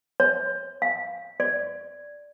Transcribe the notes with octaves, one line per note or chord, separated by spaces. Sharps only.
C#5
F5
D5